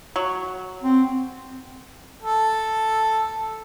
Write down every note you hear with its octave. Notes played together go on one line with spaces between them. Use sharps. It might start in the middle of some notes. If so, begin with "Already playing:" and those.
F#3
C4
A4